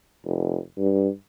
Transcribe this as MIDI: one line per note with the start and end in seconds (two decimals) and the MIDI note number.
0.25 0.57 29
0.78 1.08 43